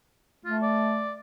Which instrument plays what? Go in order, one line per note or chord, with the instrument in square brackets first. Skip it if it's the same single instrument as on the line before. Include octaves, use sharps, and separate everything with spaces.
[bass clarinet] A3 [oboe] F4
[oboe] D5